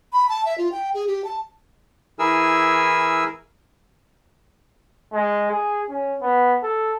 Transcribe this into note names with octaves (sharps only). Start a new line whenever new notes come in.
B5
A5
E5
F4
G5
G#4
G4
A5
E3 E4 G#4 A#4 G#5 E6
G#3
G#4
C#4
B3
A4